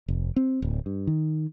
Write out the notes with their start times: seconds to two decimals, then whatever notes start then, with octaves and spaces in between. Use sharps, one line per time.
0.08 F1
0.36 C4
0.62 D1
0.86 G2
1.07 D#3